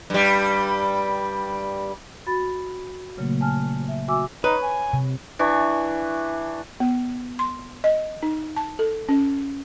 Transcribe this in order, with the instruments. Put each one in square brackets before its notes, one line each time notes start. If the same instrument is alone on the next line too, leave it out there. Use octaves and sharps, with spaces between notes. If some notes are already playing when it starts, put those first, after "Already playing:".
[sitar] G2 G3
[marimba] F#4 B5 A6
A#2 C#3 F#3 A3 A#3
G#5 A5 F6
E5
F#4 E5 G#5 D6 E6
[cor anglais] D#4 [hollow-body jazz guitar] B4 [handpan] C#5
[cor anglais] G#5
[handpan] C3
[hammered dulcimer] E3 D4 C#6
[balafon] B3
C6
D#5
D#4
A5
A4
C#4